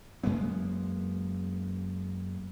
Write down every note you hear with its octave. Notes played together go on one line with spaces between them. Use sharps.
F#2 G#3 A#3 B3